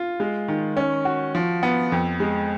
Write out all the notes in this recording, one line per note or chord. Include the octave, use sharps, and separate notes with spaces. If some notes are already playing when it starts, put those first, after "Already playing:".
Already playing: F4
G#3
D#3
C#4
F#4
F3
B3
F2
G#3